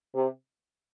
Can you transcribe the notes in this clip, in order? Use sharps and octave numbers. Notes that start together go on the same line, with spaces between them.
C3